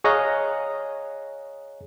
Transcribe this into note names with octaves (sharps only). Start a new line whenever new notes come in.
G#4 C#5 D#5 F5 A#5 F#6